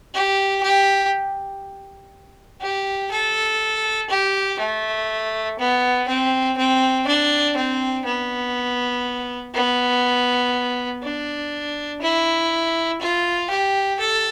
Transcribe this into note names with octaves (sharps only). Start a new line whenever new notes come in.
G4
G4
G4
A4
G4
A3
B3
C4
C4
D4
C4
B3
B3
D4
E4
F4
G4
A4